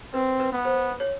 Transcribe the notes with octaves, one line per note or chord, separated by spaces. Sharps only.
C4 B4
B4
B3
C5
C#5